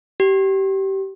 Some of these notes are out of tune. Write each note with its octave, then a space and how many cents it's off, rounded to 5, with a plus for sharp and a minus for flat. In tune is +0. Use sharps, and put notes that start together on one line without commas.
G4 -20